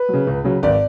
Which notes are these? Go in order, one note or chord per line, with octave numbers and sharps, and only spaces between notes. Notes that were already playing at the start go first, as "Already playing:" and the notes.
Already playing: B4
C#3 F#3
C#2
C#3 F#3
G#1 D5